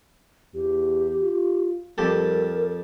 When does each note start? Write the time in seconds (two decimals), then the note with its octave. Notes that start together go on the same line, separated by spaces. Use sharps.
0.54 E2 G4
1.22 F4
1.98 F2 G3 G4 A4 A#4